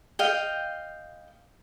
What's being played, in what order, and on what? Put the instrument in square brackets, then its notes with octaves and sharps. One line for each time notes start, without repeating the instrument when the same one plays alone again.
[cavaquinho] D#5 F5 G5